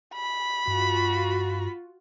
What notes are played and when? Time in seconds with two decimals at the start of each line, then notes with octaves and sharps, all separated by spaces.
0.14 B5
0.67 G2 F4 F#4